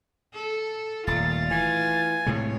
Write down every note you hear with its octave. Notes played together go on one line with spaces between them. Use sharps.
A4
D#1 A3 F4 A6
E3 G#5
A2 C3 G#3 C#5